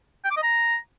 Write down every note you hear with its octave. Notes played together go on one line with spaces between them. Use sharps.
G5
D6
D#5
A#5